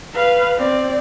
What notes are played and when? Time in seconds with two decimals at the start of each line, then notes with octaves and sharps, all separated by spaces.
0.14 B4 F5
0.56 C4 D5